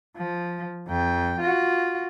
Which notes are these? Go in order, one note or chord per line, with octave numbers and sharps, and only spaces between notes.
F3
F2 G5
F4 F#4